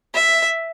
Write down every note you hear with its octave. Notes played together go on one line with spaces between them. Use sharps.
E5